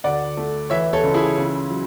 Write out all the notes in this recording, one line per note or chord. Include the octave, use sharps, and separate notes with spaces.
D2 D5 F#5
A3
E3 C#5 E5
A4 C#5
C#2
E4 G#4
C#3
F#3